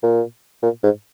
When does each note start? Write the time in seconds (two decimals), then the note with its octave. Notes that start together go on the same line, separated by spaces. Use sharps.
0.03 A#2
0.63 A#2
0.83 G#2